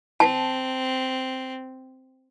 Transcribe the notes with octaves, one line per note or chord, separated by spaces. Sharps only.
C4 A5